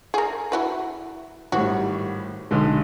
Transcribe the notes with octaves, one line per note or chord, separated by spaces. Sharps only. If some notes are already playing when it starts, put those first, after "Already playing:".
G#4 A#4
E4 F#4 B4
G#1 A2 G3 F#4
B1 D3 G#3